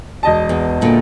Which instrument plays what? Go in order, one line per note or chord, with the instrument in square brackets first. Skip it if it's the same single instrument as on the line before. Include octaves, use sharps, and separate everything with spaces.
[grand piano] E1 D#5 A5
[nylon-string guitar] E2
E2 A#2 D3